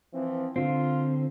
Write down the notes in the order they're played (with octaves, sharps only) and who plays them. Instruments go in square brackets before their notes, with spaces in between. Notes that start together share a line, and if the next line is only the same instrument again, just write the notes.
[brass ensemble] E3 F3 C4
[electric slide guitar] D3 C4 [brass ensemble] F4